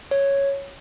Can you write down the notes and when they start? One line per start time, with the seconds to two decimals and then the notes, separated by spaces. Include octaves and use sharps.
0.11 C#5